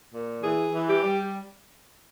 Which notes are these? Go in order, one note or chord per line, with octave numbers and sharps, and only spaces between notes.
A#2
E3 G#4
E3
G4
G3